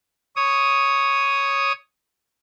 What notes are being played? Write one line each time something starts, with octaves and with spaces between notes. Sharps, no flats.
C#5 D#6